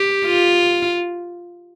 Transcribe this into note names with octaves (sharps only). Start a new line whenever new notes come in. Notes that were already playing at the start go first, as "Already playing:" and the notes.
Already playing: G4
F4